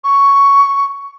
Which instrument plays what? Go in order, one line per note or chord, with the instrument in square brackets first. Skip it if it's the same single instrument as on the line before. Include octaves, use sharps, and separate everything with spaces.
[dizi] C#6